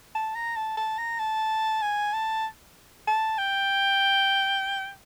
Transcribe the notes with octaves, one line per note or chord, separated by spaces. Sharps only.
A5
A#5
A5
A5
A#5
A5
G#5
A5
A5
G5